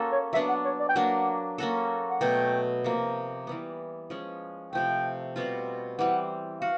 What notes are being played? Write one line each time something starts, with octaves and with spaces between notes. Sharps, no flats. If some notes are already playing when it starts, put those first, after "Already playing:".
Already playing: A#3 C#4 F#4 A4
C#5
F#3 B3 D4 E5
F#5
C#5
D5
G5
F#3 A#3 D4 F#5
A#3 C#4 F#4 A4
F#5
B2 F#3 A3 G5
C3 F3 A#3
E3 G3 B3
F3 G#3 C#4
C3 F3 A3 G5
B2 G3 C4 F4
E3 G3 C4 F#5
F#4 F5